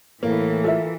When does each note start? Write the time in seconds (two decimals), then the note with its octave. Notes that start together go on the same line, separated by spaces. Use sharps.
0.23 A2 E3 A#3
0.64 F4 A4 A#4 E5